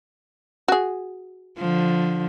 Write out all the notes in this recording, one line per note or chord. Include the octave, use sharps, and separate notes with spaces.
F#4 G#4
D3 F3